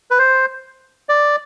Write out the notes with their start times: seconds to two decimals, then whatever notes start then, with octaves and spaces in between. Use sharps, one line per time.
0.11 B4
0.18 C5
1.09 D5